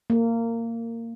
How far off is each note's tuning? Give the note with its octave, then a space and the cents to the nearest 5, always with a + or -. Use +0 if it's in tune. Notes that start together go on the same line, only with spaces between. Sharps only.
A#3 -20